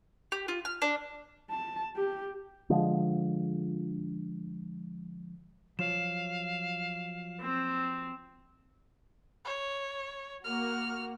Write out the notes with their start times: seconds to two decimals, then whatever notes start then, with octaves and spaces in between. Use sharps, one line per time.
0.32 G4
0.48 F4
0.65 F6
0.82 D4
1.50 A5
1.96 G4
2.70 D3 F3 G#3
5.79 F3 F#3 F4 F5 E7
7.41 C4
9.45 C#5
10.44 A#3 F#4 F6